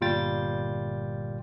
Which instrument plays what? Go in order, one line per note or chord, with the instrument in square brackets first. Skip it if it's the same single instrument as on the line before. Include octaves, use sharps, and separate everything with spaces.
[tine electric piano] G1 A#2 G3 F4 G5 A6